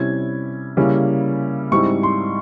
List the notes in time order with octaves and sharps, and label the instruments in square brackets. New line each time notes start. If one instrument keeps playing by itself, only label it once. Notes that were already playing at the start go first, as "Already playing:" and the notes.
Already playing: [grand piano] C3 G3 C#4 E4 G#6
C#3 G3 A#3 C#4 E4
G#2 G3 C4 E4 C#6
C6